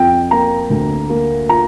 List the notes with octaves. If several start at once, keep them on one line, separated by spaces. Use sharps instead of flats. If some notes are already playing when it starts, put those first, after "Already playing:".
Already playing: F2 G5
A#3 A#5
D2
A#3
F4 A#5